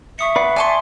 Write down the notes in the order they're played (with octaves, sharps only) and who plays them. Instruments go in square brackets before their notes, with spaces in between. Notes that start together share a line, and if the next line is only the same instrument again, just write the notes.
[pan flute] E5 [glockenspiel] C#6 D#6 C#7
[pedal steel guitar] B4 D5 F#5 [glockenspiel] C7
[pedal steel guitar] D5 C6 [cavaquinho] G#5 A5 C#6